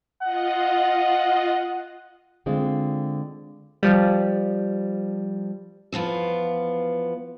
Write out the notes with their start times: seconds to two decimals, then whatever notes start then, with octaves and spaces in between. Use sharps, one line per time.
0.22 F4 D#5 F#5
2.46 D3 G#3 C4 F4
3.83 F3 G3
5.92 E2 F3 B3 F4